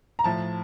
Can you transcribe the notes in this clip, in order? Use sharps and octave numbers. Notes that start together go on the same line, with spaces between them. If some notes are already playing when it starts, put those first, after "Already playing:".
A#5
A2 F3 A5